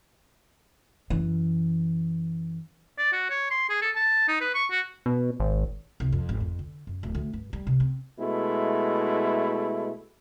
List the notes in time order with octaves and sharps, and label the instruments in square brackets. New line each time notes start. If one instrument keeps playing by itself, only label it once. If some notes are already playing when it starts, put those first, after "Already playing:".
[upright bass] F#2 E3
[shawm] D5
F#4
C#5
C6
G#4
A4
A5
D#4
B4
C#6
F#4
[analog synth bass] B2
G#1
[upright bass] C2
F2
G#1
F2
D3
F#2
D1
D2
G2
G3
C3
C4
[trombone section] B2 G#3 A3 E4